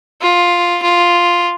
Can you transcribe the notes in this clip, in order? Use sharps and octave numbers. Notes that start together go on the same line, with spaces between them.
F4
F4